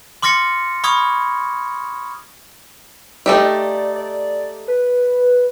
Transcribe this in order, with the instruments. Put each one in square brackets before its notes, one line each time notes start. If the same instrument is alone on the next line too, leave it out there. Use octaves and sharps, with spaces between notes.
[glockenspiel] C6 D6 F6 A6 A#6 C#7
B5 C#6 D#6 F6 G#6
[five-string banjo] A3 D#4 G4
[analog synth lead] D5
D5
B4